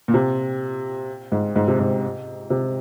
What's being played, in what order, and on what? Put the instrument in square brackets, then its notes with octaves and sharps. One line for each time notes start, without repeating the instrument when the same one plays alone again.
[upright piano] A#2
C3
G#2
G#2
C3
G#2
C3